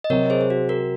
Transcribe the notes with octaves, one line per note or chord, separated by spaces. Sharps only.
D#5
C3 F#3 C4 A#4 C#5
G#4 C5
G#4
F#4
F#4 A#4